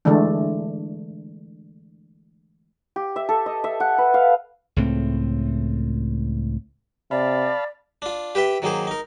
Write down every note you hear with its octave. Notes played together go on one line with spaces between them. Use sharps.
D3 E3 G#3 A3 D4
G4
E5
A4
D#5
E5
F#5
B4
F5
C#2 A2 C4
C3 D5 F5 A5 B5
D4 F4
G4 B4 E5 G5
D#3 F#3 A#3 G#4 C5
D#4 A#4